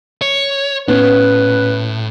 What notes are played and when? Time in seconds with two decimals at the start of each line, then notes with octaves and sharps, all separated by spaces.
0.22 C#5
0.88 A2 B3 C#4 B4